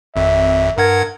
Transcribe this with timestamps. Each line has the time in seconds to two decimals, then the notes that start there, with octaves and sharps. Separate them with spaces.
0.16 G#1 F2 E5
0.78 G2 A#4 F#5 G#6